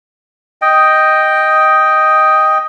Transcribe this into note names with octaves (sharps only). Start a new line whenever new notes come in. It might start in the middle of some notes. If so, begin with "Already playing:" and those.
D#5 G5